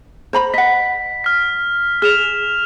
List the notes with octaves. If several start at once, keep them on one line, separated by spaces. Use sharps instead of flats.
C5 A#5 B5
D#5 F#5 B6
F6 B6
G#4 F6 E7 F7